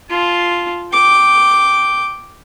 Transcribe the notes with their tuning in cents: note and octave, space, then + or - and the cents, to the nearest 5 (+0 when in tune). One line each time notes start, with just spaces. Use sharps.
F4 +0 A5 -25
G5 +0 D6 +0